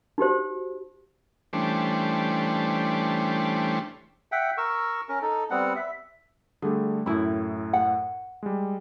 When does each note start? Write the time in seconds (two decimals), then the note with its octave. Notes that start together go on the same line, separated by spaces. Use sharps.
0.18 D#4 F#4 G4 C5
1.53 E3 G3 A3 C#4 D4 C5
4.32 E5 F#5 G5
4.58 A#4 C#6 E6
5.09 C#4 A#4
5.22 D#4 A4
5.50 G3 B3 C4 F#5
5.76 E5
6.62 D3 G3 A3 G#4
7.06 F#2 A2 E4 B5
7.73 F#5
8.43 G3 G#3